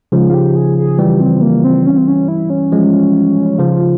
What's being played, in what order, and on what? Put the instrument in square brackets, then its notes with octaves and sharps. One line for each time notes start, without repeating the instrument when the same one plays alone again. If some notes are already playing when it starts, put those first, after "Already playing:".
[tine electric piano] C#3 F3 [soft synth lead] G#3
[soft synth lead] F4
G4
G#4
G#4
[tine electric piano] E3 G3 [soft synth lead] G4
[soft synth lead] C4
A#3
C4
C#4
C4
C#4
E4
C#4
[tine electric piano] F3 G#3
[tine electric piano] C#3 F3 [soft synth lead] F4